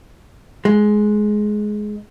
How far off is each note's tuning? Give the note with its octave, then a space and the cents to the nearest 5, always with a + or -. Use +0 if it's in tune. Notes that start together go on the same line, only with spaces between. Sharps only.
G#3 +15